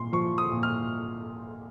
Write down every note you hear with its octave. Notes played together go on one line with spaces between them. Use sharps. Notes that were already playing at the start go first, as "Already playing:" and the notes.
Already playing: A#2 C6
F3 C#6
D#6
A#2
F6